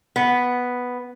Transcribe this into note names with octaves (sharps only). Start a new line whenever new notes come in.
B3